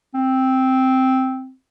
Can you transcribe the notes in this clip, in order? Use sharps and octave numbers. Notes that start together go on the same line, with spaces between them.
C4